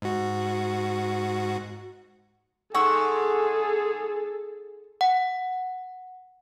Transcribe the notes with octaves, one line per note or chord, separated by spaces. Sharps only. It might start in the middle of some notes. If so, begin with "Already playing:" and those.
G#2 F#4
G#2 G#4 A4 F#5 C#6 E6
F#5